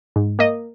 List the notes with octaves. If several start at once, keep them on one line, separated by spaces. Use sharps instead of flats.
G#2
A#3 D#5